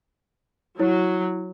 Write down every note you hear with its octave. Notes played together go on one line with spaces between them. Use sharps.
F#3 E4 C#5